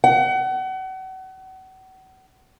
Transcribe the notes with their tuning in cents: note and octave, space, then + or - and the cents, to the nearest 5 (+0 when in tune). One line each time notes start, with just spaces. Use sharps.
F#5 +35